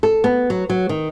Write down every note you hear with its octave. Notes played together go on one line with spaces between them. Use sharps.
A4
B3
F#3
F#3
D#3